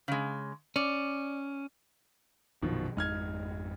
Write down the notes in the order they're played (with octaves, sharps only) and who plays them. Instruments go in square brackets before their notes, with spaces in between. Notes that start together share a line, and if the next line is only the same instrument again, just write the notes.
[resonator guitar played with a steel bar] C#3 G#3
[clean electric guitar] C#4 [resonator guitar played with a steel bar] D5
[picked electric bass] A#1 F#2 [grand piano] B2 D#3 F3
[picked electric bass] G#1 F2 G#3 [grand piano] D#4 F6 G#6